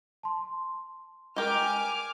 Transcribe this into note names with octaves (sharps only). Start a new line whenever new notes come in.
A5 C6
G#3 G4 A#4 G#5 D6 F6